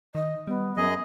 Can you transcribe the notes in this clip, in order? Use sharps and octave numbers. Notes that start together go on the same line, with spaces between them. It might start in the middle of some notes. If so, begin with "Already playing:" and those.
D#3 D#5
G3 B3
F#2 F#3 G#4 D#5